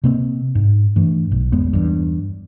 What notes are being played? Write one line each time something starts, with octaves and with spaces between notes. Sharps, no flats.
C3 A#3 C4
G#2
G2 E3 A3
B1
G1 E2 G#3 B3
E2 G2